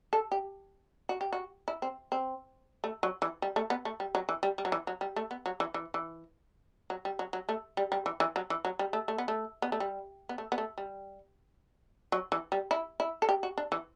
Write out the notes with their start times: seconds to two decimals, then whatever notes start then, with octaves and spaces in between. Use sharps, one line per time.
0.13 A4
0.32 G4
1.09 F#4
1.21 G4
1.33 F#4
1.68 E4
1.82 C4
2.12 C4
2.84 A3
3.03 F#3
3.22 E3
3.42 G3
3.56 A3
3.70 B3
3.85 A3
4.00 G3
4.15 F#3
4.29 E3
4.43 G3
4.58 G3
4.65 F#3
4.72 E3
4.87 F#3
5.01 G3
5.16 A3
5.31 B3
5.46 F#3
5.60 E3
5.74 E3
5.94 E3
6.90 F#3
7.05 G3
7.19 F#3
7.33 F#3
7.49 A3
7.77 G3
7.92 G3
8.06 E3
8.20 E3
8.36 F#3
8.50 E3
8.65 F#3
8.79 G3
8.93 A3
9.08 A3
9.18 B3
9.28 A3
9.62 B3
9.72 A3
9.80 G3
10.29 B3
10.38 A3
10.52 B3
10.58 A3
10.78 G3
12.12 F#3
12.32 E3
12.52 G3
12.71 E4
13.00 E4
13.22 A4
13.29 G4
13.43 F#4
13.58 D4
13.72 E3